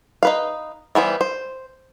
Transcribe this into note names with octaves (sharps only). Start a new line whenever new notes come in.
D#4 B4 F5
E3 G3 B3 C5
C5